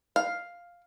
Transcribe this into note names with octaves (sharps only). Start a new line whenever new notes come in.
F5